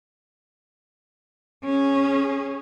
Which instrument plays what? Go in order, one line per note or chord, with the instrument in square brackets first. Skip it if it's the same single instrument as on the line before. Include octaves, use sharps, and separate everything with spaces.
[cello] C#4 G#4